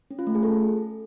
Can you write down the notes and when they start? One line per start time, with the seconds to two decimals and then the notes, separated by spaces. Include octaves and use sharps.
0.11 C#4
0.19 F4
0.27 A3
0.35 G#4
0.43 A4